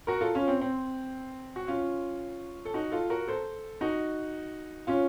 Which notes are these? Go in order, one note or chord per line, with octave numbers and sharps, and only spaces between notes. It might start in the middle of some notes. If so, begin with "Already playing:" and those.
F#4 A#4
F4 A4
C#4 F4
C4
C4
F#4
C#4 F4
A4
D#4 F#4
F4 A4
F#4 A#4
A4 C5
D#4 F#4
C#4 F4